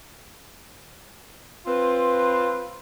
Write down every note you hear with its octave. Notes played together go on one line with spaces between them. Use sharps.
C4 F4 B4